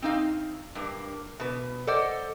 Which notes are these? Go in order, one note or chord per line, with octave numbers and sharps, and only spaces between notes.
C4 D#4 F5
G2 A#3
B2 B4
A4 C5 D5 D#5 F#5